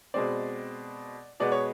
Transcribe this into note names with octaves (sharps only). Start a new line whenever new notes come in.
B2 G#3 C4 D5
B2 G#3 B3 D5
C#5